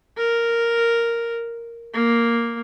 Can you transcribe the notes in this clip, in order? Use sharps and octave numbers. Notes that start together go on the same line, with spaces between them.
A#4
A#3